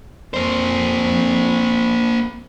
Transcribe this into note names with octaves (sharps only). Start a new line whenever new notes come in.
F2 A#3 C5